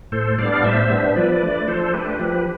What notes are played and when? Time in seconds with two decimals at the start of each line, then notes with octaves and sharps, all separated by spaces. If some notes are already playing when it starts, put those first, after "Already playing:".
0.12 A2 A4 C5
0.38 G3 B3 D4 D5 F5
0.52 F5
0.63 A2 C5 E5
0.90 G3 B3 D4
1.16 F3 B4 D5
1.42 A3 D4
1.68 F3 A4 C5
1.94 A3 D4 G4 B4
2.20 F3 G4 B4